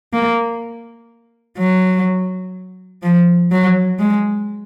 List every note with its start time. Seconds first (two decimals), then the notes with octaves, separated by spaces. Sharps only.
0.13 A#3
1.58 F#3
3.03 F3
3.52 F#3
3.99 G#3